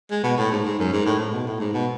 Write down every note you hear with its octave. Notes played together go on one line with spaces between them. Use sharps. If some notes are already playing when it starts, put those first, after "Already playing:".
G#3
B2
A2
G#2
G#2
F#2
G#2
A2
A2
B2
A2
G#2
B2